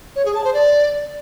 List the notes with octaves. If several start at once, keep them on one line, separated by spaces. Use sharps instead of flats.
C#5
G#4
A5
C5
D5